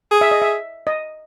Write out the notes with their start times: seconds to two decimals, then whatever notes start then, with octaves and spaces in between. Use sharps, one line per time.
0.11 G#4
0.21 E5
0.31 D#5
0.42 E5
0.87 D#5